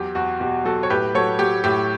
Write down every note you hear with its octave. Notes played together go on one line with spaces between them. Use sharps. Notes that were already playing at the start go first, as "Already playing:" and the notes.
Already playing: E2 F#3 G4
E2 F#4
B2 G4
F#3 F#4 A4
C#5
A2 G4 B4
F#3 A4 C#5
F#3 G4
A2 G4